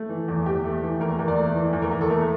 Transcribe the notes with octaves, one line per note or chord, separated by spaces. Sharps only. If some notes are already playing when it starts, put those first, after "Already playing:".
Already playing: A3
E3
E2
E2 G4
A3
E3
E2 A#4
E2
D5
A3
E3
E2
A#4
E2
A4
A3 A#4